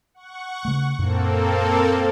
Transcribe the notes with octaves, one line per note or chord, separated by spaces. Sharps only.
F#5 C#6
C#3 A3
F#2 A#2 A#3 C4 A4